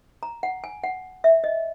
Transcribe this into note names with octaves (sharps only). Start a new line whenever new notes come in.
A#5
F#5
G#5
F#5
E5
D#5